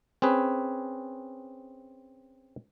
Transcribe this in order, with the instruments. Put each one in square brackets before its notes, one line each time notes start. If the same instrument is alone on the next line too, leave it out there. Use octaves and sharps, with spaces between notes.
[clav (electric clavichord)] C4 C#4 G#4 B4